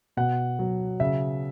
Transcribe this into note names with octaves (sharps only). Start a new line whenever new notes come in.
B2 F#5
F#3
C#3 E5